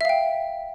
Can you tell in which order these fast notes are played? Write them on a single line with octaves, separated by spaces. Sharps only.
E5 F5 G5